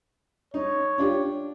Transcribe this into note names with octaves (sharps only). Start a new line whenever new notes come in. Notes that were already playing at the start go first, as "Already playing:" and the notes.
D#4 C#5
D4 F4 G4